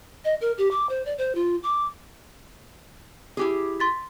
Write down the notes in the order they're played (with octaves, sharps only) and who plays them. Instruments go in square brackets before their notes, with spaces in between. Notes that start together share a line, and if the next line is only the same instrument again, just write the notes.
[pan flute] D#5
A#4
G4
D6
C5
D5
C5
F4
D6
[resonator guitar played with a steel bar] E4 G4 G#4
[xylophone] C6 A6 B6